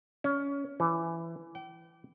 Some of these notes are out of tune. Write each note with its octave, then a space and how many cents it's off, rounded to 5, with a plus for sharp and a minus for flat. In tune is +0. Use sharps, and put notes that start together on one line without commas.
C#4 +20
E3 +15
G5 -35